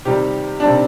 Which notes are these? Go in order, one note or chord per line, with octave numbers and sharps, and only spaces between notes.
C3 D#3 G3 G4
D4
C3 D#3 G3 C4